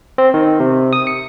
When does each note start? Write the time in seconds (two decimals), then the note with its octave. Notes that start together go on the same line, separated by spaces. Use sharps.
0.18 C4
0.34 D#3
0.60 C3
0.93 D#6
1.07 C#7